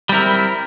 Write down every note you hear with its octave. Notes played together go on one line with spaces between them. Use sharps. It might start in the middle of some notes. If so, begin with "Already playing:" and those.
G3 C4 E4 A#4